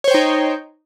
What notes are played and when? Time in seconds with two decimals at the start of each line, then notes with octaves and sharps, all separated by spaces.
0.04 C#5
0.08 C5
0.11 G5
0.14 D#4